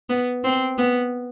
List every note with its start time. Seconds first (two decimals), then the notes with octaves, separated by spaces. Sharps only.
0.09 B3
0.44 C4
0.78 B3